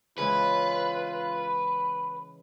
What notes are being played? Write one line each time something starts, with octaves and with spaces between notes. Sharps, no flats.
C#3 E3 G#3 F4 B4